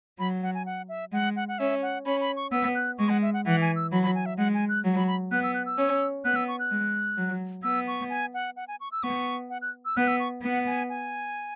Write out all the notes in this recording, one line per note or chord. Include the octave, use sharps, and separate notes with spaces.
F#3 B5
F#5
G#5
F#5
E5
G#3 F#5
F#5
F#5
C#4 E5
F#5
C#4 B5
B5
C#6
B3 E6
F#6
G#3 C#6
F#5
E5
F#5
E3 F#5
G#5
E6
F#3 B5
B5
G#5
E5
G#3 F#5
G#5
F#6
F#3
B5
B5
B3 F#6
E6
F#6
E6
C#4
B3 F#6
E6
C#6
F#6
G#3
F#3
B3 E6
C#6
G#5
F#5
F#5
G#5
C#6
E6
B3 C#6
F#5
F#6
E6
B3 F#6
E6
C#6
B3 F#5
G#5
G#5